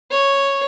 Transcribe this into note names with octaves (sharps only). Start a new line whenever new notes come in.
C#5